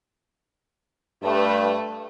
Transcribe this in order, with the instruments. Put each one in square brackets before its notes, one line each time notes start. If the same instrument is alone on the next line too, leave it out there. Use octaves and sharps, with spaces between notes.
[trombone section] G2 [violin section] A3 B4